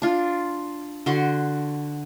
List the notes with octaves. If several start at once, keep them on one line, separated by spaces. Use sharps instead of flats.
D4 F4
D3 F#4 C6